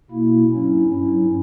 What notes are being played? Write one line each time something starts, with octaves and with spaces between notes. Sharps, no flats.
B2 A#3 E4
G2 F#3 C#4 E4
G2 F#3 C#4 E4